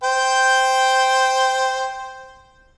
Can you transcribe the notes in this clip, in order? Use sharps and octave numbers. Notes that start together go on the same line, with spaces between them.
C5 G5